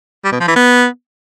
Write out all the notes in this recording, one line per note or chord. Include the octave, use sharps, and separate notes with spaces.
G3
B2
F3
E3
B3